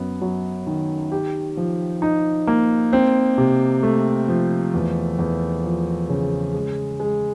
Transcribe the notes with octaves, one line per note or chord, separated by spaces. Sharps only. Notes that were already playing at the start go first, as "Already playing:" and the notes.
Already playing: F#2 B3
F#3
D#3
G4
F3
D#4
A#3
C4
C3
A3
F3
E2
E2
F3
C#3
G#3
G#3